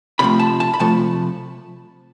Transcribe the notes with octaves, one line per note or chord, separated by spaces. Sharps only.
C3 F3 A3 B5
A5
A5
B5
C3 F3 A3 A5